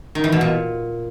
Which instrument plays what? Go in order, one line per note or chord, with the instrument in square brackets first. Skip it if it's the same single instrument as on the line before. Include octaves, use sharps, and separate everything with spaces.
[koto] D#3
E3
B2
A#2